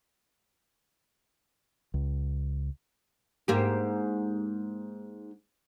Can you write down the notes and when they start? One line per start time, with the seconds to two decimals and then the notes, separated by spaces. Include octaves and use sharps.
1.94 C#2
3.48 G#2 A#3 G4